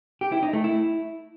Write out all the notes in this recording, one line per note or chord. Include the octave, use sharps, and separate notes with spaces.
G4
E4
D#4
A3
E4